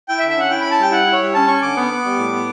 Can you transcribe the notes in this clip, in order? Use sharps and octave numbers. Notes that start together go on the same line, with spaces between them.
E4 G5
E5
D3
E5
C#4 F#5
E4 G5
C#4 B5
A5
G3 G5
E4 F#5
E4
C#5
G3
C#4 A5
C#4 C#6
D3 D6
B3
B3
G3
A2
B3